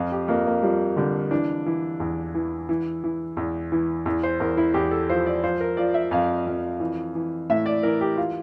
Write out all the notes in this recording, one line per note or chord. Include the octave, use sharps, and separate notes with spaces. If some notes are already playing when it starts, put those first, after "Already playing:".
Already playing: F2 F4
G4
F2 A#3
A#3
F3 G3
D3 G3
E3 D4
E3
E2
E3
E3
E3
E2
E3
E2
C5
E2 A#4
E4
E2 G4
A4
F3 C5
D5
F3 C5
A#4
F3 D5
E5
F2 F5
F2
E3
E3
A2 E5
D5
E3 A#4
G4
F4